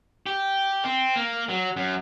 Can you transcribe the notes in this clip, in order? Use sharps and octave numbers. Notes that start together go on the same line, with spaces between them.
G4
C4
A#3
F#3
F#2